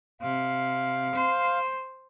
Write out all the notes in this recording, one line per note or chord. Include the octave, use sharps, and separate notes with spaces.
C3 F5
C5